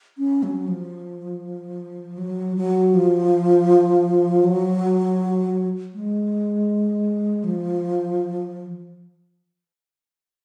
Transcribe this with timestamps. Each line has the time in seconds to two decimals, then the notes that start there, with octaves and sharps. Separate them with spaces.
0.18 C#4
0.43 F#3
0.68 F3
2.18 F#3
2.57 F#3
2.94 F3
4.44 F#3
5.94 G#3
7.44 F3